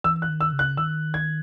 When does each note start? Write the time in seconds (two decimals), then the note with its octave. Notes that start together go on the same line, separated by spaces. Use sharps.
0.04 E3 E6
0.22 F#6
0.29 D#3
0.41 E6
0.53 C#3
0.59 F#6
0.77 D#3 E6
1.14 G#6